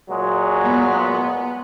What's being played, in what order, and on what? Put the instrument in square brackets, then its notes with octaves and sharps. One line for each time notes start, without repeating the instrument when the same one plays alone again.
[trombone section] A#2 F#3 G#3
[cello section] B3